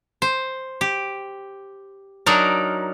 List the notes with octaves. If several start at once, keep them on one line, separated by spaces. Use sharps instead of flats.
C5
G4
F#3 D4 D#4 A#4